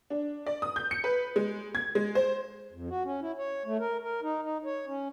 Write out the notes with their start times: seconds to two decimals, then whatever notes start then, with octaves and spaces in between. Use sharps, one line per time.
0.10 D4
0.46 D5
0.62 D#6
0.76 G6
0.91 C#7
1.04 B4
1.36 G#3
1.75 G#6
1.95 G#3
2.15 C5
2.72 F2
2.90 F#4
3.05 C#4
3.21 E4
3.38 C#5
3.65 A3
3.79 A#4
4.03 A#4
4.23 D#4
4.42 D#4
4.65 C#5
4.87 C#4